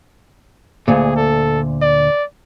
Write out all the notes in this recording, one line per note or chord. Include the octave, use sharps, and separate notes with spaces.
D2 A#2 G#4
A4
D5